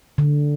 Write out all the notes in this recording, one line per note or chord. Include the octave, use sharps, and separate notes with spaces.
D3